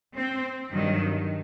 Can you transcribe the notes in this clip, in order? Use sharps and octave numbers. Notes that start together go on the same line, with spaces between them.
C4
G2 D#3 F#3